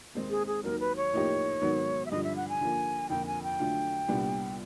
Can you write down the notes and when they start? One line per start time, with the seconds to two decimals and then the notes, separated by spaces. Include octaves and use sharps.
0.15 D#2 D#3 G#3 C4
0.30 G#4
0.47 G#4
0.64 D#2 D#3 F#3 A#4
0.79 B4
0.96 C#5
1.13 A2 F3 A#3 D#4 G4
1.62 G#2 D#3 F#3 B3
2.06 E5
2.11 G2 D3 F3 D#5
2.23 E5
2.36 F#5
2.49 G#5
2.61 D3 F3 A#3
3.09 F2 D3 F3 A#3 G5
3.26 G#5
3.43 G5
3.59 D3 F#3 A3 D4 F4
4.08 C2 A#2 G3 B3 D4